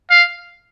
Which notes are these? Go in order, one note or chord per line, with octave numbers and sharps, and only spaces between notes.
F5